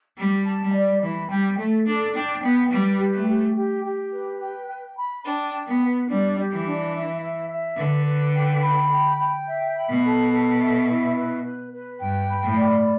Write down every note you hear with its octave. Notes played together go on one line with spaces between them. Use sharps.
G3 G4
A5
G3
D5
E3 B5
G3 G5
A3 A4
D4 A4
D4 G5
B3 G5
G3 B4
G4
A3
G4
G4
G4
B4
G5
G5
B5
D4 G5
G5
B3
B4
G3 D4
G4
E3
D4
E5
E5
E5
D3 B4
B4
G5
B5
G5
G5
E5
B5
B2
A4
A4
E5
E4
B4
B4
B4
G2 G5
B5
A2
D5